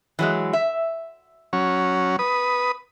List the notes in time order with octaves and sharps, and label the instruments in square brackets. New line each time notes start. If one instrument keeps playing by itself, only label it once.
[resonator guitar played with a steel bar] E3 F#3 G#3
E5
[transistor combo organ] F#3 C#4
B4 D#6